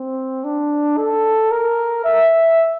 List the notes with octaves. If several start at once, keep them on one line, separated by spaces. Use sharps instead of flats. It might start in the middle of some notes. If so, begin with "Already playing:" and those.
Already playing: C4
D4
A4
A#4
E5